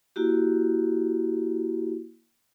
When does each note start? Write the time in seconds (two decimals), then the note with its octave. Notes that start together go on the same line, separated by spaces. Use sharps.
0.16 A#3 E4 F#4 G4